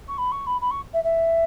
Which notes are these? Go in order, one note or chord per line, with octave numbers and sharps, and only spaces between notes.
C#6
B5
C#6
B5
B5
C#6
E5
E5